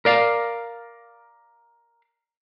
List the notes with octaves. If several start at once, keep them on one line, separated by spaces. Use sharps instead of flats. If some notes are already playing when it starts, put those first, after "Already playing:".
A#4 D5 F5